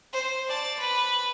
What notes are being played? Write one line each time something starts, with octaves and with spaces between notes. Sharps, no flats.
C5
D5 A5
B4